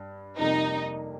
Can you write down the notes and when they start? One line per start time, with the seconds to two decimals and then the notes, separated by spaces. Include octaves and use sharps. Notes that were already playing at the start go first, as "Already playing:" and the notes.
Already playing: G2
0.39 F2 C3 G3 A#3 D#4